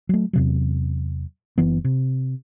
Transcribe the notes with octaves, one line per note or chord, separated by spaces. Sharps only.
F#3 A3
E2 C3 F#3
F#1 E3 B3
C3